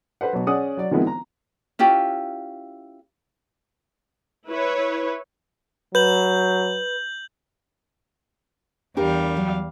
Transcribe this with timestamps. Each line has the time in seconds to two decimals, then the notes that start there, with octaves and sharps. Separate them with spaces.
0.21 A4 B4 C5 F#5
0.33 B2 F#3
0.47 C#4 G#4 D5 F#5 D#6
0.77 F#3 D5
0.91 D#3 F3 G#3 B3 C4 E4
1.07 A#5
1.79 C#4 E4 F4 G4
4.47 E4 B4 C#5
5.95 F#3 B4 G6 F#7
8.97 E2 G3 D4 G4 A#4 F5
9.37 F#3